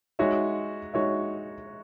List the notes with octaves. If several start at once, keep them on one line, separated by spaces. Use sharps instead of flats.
G#3 D#4 F#4 C#5 E5
G#3 D#4 F#4 C#5 E5